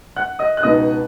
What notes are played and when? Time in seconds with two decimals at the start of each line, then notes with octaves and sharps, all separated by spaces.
0.16 F#5 F#6
0.39 D#5 D#6
0.57 F#6
0.63 C#2 B2 B3 D#4 D#5 D#6